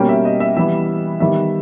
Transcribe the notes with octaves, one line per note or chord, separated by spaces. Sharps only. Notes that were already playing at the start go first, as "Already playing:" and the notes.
Already playing: B2 G3 A#3 C#4 G5
E5
D#5
E5
E3 G3 B3 E5
D#3 G3 B3 E5